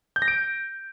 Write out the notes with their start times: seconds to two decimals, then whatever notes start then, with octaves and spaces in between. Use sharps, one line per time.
0.16 G6
0.22 A#6
0.28 D7